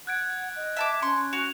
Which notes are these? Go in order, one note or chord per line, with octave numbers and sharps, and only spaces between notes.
F#5 F#6 G#6 D7
D#5
E5 A5 D6
C#4 C6 C#6
F#4 F7